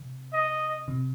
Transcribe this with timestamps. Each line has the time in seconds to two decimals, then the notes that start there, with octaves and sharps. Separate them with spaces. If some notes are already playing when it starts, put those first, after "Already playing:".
Already playing: C3
0.34 D#5
0.88 C3